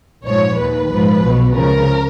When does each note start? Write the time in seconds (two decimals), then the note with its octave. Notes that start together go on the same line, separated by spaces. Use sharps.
0.25 A#1 G#2 F3 C#5
0.57 D#2 D#3 B4
0.89 A#1 G#2 F3
1.21 B1 B2
1.53 C#2 C#3 F3 A#4